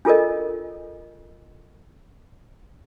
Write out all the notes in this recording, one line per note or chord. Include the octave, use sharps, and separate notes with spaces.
D4 F4 A4 A#4 D#5